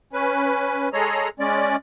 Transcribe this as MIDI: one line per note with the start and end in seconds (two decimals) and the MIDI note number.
0.13 0.89 61
0.13 0.89 71
0.93 1.29 56
0.93 1.29 68
0.93 1.29 69
0.93 1.29 73
0.93 1.29 82
1.40 1.76 56
1.40 1.76 61
1.40 1.76 74